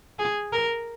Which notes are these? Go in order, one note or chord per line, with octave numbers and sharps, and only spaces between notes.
G#4
A#4